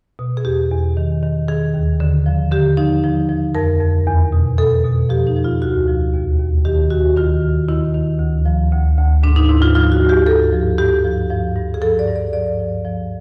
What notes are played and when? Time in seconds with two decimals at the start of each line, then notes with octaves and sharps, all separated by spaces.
0.19 B2
0.37 G#4
0.45 E2 G4
0.71 E2
0.97 D#3
1.23 D#3
1.48 D#3 G#4
1.74 D#2
2.00 D3
2.26 F3
2.52 D3 G4
2.77 F3 D#4
3.04 F3
3.29 F3
3.55 F2 A#4
3.81 F2
4.07 E2
4.32 B2
4.58 B2 A4
4.84 B2
5.10 F3 G4
5.27 D#4
5.36 F3
5.44 F4
5.62 D2 F#4
5.88 F3
6.13 D#2
6.39 D#2
6.65 D#3 G4
6.90 D#2 F#4
7.17 D#3 F4
7.42 D#3
7.68 D#3 E4
7.94 D#3
8.20 D2
8.46 F3
8.72 D2
8.98 D2
9.23 G#2 D4
9.36 D#4
9.49 G#2 E4
9.62 F4
9.75 F3 F4
9.92 F#4
10.01 F3
10.09 G4
10.26 G2 A4
10.52 F3
10.78 G2 G4
11.05 F3
11.30 F3
11.56 G2
11.74 G#4
11.81 F3 A4
11.99 D5
12.07 G2
12.16 D5
12.33 F3 D5
12.59 F3
12.85 F3